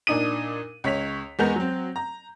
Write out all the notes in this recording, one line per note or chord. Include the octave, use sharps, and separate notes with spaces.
A#2 D4 D#4 D#6 D#7
C#2 C#5 B6 F7
E2 G#3 B3 A#4 G6 F7
F#3 C4
A#5